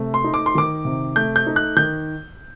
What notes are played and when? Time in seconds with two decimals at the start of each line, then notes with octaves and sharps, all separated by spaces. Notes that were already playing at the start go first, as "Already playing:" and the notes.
Already playing: C3 A3
0.14 C6
0.24 D#4
0.34 D6
0.46 C6
0.55 D#3 D6
0.85 C3
1.16 A3 G6
1.36 G6
1.47 D#4
1.56 F#6
1.76 D#3 G6